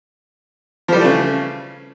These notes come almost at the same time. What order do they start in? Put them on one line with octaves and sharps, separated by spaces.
F3 G3 E3 A3 C#3